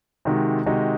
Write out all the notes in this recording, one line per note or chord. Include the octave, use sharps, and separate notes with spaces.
C3 D#3 G#3 D#4 F#4
C3 D#3 G#3 D#4 F#4